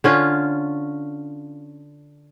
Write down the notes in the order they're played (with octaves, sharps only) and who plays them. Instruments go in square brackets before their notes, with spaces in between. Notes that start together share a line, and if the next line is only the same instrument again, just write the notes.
[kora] D3 C#4 F4